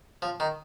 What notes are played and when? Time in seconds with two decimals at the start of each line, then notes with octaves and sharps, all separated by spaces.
0.22 F3
0.40 D#3